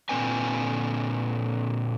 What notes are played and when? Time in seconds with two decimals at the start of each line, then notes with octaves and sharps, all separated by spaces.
0.09 A#2 D3 G#3 C4 B4 G#5